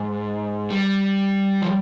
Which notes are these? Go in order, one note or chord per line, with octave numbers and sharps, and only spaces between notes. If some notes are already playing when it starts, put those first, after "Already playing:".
Already playing: G#2
G3
F3